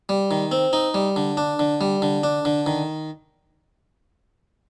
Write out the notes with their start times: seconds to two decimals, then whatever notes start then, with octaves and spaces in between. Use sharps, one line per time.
0.09 G3
0.31 D#3
0.51 C4
0.73 D#4
0.94 G3
1.16 D3
1.37 D4
1.59 D3
1.81 G3
2.02 D3
2.23 D4
2.45 D3
2.66 D#3